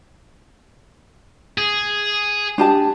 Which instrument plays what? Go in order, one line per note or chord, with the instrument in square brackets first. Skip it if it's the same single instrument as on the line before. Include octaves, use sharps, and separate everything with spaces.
[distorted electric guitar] G#4
[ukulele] D4 G4 A5